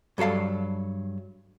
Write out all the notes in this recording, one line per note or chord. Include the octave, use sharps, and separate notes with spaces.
G2 F#3 A4 F5 A5